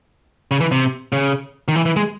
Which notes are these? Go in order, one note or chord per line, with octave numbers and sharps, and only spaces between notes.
C#3
E3
C3
C#3
D#3
E3
E3
G#3